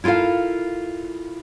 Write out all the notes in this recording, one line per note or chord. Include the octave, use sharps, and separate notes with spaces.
E4 F4 A4 A#4 F5